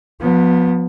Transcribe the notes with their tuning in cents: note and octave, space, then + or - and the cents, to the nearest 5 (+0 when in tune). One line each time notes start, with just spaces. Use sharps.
F3 +35 B3 +0